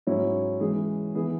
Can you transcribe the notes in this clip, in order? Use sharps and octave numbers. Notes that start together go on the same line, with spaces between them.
G#2 F#3 C#4 E4 C#5
E3 G#3 C#4 G#4
E3 B3 G#4 B4